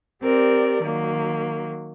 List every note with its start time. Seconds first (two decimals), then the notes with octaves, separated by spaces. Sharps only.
0.22 C4 G4 A#4 D5
0.82 D#3 F#3 A#3